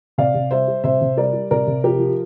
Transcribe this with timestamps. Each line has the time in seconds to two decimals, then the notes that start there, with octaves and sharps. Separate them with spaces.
0.18 C3 D5 F5
0.35 C3
0.51 G3 C5 E5
0.68 G3
0.84 C3 C5 E5
1.01 C3
1.17 G3 A#4 D5
1.33 G3
1.51 C3 A#4 D5
1.67 C3
1.84 F3 G4 A#4
1.99 F3